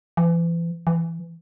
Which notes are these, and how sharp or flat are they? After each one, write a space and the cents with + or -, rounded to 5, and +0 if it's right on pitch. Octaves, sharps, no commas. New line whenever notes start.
E3 +35
E3 +15